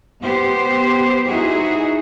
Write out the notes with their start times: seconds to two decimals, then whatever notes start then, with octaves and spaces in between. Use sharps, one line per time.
0.22 B3 G4 C5
1.26 D#4 E4 F#4 G#4